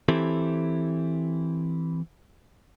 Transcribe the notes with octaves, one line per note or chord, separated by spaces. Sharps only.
E3 C4 E4 G4 A4